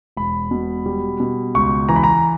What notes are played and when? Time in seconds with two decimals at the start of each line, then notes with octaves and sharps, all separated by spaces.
0.17 E1 B5
0.51 B2
0.86 G3
1.20 B2
1.54 C#2 C#6
1.89 E3 A#5
1.96 B5
2.04 A#5